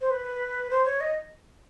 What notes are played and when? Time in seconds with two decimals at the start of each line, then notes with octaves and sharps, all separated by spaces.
0.01 C5
0.10 B4
0.71 C5
0.85 C#5
1.01 D#5